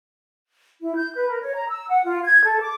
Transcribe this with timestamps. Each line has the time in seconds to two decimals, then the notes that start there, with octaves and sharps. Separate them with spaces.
0.81 E4
0.96 G6
1.15 B4
1.29 A#4
1.42 C#5
1.55 A#5
1.69 E6
1.88 F#5
2.04 F4
2.23 G#6
2.44 A4
2.61 D6